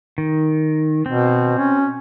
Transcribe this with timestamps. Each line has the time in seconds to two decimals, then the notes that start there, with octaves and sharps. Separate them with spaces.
0.18 D#3
1.06 B2 C4
1.58 C#4